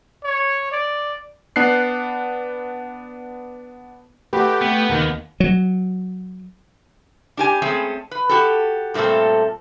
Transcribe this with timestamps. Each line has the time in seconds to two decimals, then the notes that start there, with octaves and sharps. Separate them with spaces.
0.24 C#5
0.72 D5
1.56 B3 D4 F#6 C7
4.33 A3 D4 F#4 G4 B4
4.62 B3
4.89 D#2 D#3 A#3
5.40 F#3
7.37 D4 G4 G#5
7.62 G#3 A3 C4 C#4 G#4 A4
8.11 B4
8.29 F#4 G4 A4
8.94 G2 A#2 A3 C4 A4